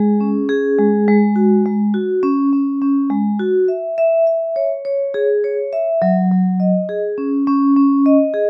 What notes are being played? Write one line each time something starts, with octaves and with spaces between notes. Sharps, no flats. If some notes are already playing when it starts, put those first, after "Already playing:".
Already playing: G#3 G#4
C#4
G#4
G#3
G#3
F#4
G#3
F#4
C#4
C#4
C#4
G#3
F#4
E5
E5
E5
C#5
C#5
G#4
C#5
E5
F#3
F#3
D#5
G#4
C#4
C#4
C#4
D#5
G#4